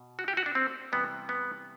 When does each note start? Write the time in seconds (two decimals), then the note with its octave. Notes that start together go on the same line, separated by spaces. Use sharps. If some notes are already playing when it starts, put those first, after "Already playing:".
Already playing: B2
0.19 F#4
0.28 G4
0.37 F#4
0.46 D4
0.55 C4
0.92 C3 E3 G3 B3
1.29 B3